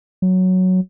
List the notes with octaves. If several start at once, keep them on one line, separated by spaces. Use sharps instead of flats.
F#3